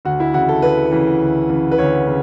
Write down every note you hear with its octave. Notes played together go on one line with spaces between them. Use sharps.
D2 F#4
E4
C#3 E3 F#4
A4
D2 B4
C#3 E3
D2
C#3 E3
B4
D2 C#5
C#3